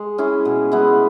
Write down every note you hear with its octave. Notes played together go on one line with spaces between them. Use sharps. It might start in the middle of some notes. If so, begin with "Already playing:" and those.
Already playing: G#3
C#4 E4 G#4
B2
G#3 B3 E4